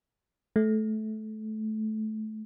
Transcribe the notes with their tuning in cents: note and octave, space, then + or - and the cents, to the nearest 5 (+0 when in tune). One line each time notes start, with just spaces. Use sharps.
A3 -20